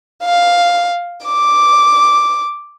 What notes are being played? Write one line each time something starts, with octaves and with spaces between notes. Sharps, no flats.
F5
D6